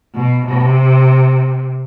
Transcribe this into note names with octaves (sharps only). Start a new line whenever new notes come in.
B2
C3